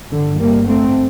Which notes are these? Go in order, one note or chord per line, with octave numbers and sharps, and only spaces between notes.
G1 G2 D3
G3 A#3
A3 C4